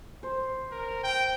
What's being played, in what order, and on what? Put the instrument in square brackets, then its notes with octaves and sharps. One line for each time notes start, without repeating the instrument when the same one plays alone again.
[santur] C5
[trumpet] A#4
G5